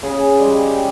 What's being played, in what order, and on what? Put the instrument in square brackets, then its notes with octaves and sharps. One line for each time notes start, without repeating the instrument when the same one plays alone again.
[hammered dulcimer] C#3 G#4
G3 G#3
G4